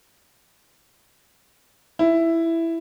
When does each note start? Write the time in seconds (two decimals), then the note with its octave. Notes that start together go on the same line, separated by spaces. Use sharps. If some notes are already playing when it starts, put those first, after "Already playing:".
1.99 E4